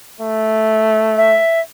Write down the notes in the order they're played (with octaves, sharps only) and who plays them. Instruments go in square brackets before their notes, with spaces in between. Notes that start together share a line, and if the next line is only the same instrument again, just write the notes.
[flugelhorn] A3
[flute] E5